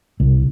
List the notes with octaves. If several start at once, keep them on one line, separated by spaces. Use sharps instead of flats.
C2